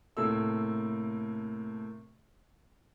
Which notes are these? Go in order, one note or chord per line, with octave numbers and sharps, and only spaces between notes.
A2 C3 A#3 A4 E6